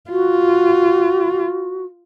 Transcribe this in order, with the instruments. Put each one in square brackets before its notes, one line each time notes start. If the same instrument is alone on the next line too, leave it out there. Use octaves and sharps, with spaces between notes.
[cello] F4 [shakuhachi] F#4